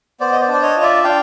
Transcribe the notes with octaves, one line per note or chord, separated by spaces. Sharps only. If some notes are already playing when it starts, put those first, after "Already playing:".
B3 C5 D5
D#5
C5 D5
D4
D5
C#5 D#5
F4
D5 E5
D4 F5 G5